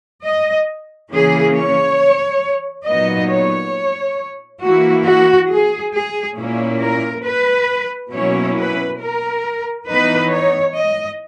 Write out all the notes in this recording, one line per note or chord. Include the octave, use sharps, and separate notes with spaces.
D#5
C#3 E3 A#3 C#4 G#4
C#5
A#2 F#3 B3 D#4 D#5
C#5
E3 A#3 E4 F#4
F#4
G#4
G#4
A#2 A#3 C#4 E4
A#4
B4
B2 F#3 A#3 C#4 E4 C#5
B4
A#4
E3 B3 D#4 B4
C#5
D#5